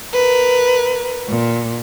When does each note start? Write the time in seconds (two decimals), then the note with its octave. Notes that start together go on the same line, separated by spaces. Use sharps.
0.13 A#4 B4
1.27 A#2